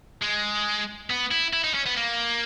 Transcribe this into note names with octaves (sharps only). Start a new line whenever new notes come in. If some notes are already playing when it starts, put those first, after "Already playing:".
G#3
B3
E4
E4
D#4
C#4
B3
A#3